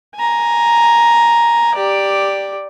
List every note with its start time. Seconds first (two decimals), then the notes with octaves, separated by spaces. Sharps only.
0.15 G#5 A#5
1.75 G4 D5